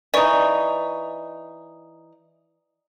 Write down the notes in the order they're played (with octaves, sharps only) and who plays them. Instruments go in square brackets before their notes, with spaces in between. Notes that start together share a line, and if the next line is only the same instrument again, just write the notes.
[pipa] E3 D#4 [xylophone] D5 C#6